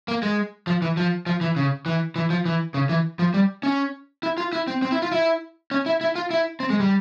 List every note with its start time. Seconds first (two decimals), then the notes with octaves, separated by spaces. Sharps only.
0.08 A#3
0.23 G#3
0.67 F3
0.82 E3
0.97 F3
1.26 F3
1.41 E3
1.56 C#3
1.86 E3
2.16 E3
2.30 F3
2.46 E3
2.74 C#3
2.89 E3
3.19 F3
3.34 G3
3.63 C#4
4.23 E4
4.38 F4
4.53 E4
4.68 C4
4.82 C4
4.92 E4
5.02 F4
5.12 E4
5.71 C#4
5.86 E4
6.01 E4
6.15 F4
6.31 E4
6.60 C4
6.70 G#3
6.80 G3